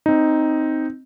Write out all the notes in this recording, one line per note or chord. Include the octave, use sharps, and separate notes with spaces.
C4 D#4